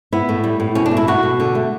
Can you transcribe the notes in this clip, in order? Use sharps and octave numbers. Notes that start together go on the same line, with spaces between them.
B3 E4
A2
G3
A2
B2 C#4
D4
A3
E4
A3 F#4
B2
D3
A3